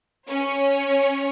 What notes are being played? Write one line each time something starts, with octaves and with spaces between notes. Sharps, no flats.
C#4 C#5